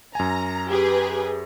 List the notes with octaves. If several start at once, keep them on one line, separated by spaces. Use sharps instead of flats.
F#2 G#5 A#5
G4 G#4 B4